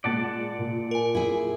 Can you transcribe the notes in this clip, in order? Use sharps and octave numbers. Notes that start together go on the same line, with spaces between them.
A#2 G#3 D5 F#5 A5
A#2
A#4 G#5
E4 G#4